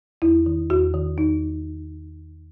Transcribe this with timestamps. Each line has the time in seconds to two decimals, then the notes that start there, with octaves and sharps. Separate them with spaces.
0.22 E2 E4
0.46 D#3
0.70 E2 F#4
0.94 D#3
1.18 E2 D#4